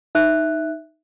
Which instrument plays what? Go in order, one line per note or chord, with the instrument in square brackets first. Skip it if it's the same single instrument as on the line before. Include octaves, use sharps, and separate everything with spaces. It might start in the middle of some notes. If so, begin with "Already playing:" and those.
[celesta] D#4 E5 F#6